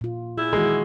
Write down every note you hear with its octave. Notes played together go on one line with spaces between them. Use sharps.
A#2 F4
E4 G#4
D#3 E3 G#3 F#4